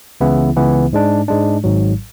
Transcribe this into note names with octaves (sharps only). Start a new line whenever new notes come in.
C#2 C#3 E3 B3 E4
C#2 C#3 E3 B3 E4
G#2 G#3 D4
G#2 G#3 D4
G#1 G#2 F#3